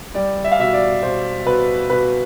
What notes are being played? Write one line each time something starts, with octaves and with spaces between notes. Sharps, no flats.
G3 D5
E5
F5
B2 E5
D5
B2 C5
B2 B4
B2 B4